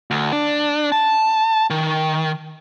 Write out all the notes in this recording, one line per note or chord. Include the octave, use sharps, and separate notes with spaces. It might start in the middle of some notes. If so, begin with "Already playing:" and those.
D2
D4
A5
D#3